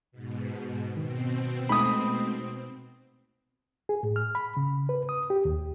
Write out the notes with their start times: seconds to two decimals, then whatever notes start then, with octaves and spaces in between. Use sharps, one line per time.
0.12 G#2 B2
0.97 B2 D#3 C4
1.69 G#3 A3 D#4 B5 D#6
3.89 G#4
4.03 A2
4.16 F6
4.35 B5
4.57 C#3
4.89 B4
5.09 D#6
5.30 G4
5.45 D#2